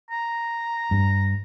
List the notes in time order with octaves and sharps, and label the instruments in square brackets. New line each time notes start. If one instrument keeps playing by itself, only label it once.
[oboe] A#5
[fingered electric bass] G2